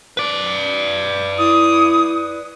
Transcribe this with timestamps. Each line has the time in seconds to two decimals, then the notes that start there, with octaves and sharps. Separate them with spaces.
0.17 B4 D5
1.38 E4 D#6